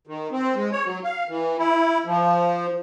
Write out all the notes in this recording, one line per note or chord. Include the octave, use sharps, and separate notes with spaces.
D#3
C4
G#3
C#5
F#3
F5
E3
E4
F3